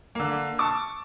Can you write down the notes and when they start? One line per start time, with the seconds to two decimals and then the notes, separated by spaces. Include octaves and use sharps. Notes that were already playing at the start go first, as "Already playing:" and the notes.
0.15 D3 A#3
0.58 A5 C#6 D6 E6